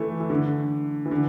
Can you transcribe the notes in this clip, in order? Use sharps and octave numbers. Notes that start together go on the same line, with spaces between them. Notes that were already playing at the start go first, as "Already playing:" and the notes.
Already playing: E3 A3
E3
D3
E3
D3